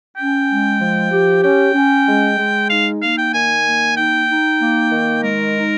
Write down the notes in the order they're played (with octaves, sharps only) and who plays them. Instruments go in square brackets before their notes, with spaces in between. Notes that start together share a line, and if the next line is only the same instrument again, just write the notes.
[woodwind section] C#4 [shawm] G5
[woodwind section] G#3
F3
G4
[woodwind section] C#4 [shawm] G5
[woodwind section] C#4
G#3
G#3
[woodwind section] D#4 [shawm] F5
[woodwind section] A#3 [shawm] F5
[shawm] G5
[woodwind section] D#3 [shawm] G#5
[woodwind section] A#3
[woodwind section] D#4 [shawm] G5
[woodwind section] D#4
A#3
D#3
[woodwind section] G#3 [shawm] A#4
[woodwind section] D#4